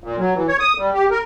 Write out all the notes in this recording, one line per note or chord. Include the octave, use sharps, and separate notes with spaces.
A#2
F#3
E3
C#5
D#6
G3
G4
A#4